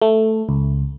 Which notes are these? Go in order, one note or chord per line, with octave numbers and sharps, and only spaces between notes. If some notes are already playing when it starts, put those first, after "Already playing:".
A3
C#2